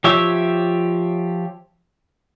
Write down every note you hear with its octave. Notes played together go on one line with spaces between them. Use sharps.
F3 G4 C#5 E5